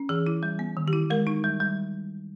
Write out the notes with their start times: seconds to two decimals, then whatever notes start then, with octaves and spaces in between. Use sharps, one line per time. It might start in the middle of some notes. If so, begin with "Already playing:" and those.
Already playing: C#4
0.09 E3 G#4
0.27 E4
0.43 G3
0.59 B3
0.77 D#3
0.88 G4
0.93 E4
1.10 G#3 A#4
1.27 D#4
1.44 G3
1.60 G3